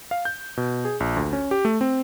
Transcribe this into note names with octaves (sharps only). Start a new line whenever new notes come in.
F5
G6
B2
G#4
A#1
D2
C#4
G4
A3
C4